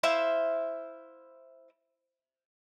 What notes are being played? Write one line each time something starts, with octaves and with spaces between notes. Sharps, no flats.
E4 C5 E5 F5